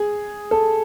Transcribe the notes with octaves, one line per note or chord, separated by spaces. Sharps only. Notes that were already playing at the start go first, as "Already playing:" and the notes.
Already playing: G#4
A4